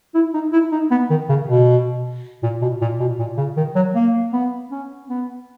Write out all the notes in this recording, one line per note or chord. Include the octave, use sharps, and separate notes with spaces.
E4
D#4
E4
D#4
B3
D#3
C#3
B2
A#2
B2
A#2
B2
A#2
C#3
D#3
F#3
A#3
B3
C#4
B3